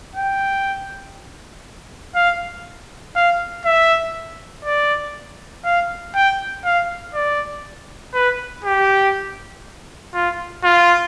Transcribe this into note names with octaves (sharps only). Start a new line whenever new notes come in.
G5
F5
F5
E5
D5
F5
G5
F5
D5
B4
G4
F4
F4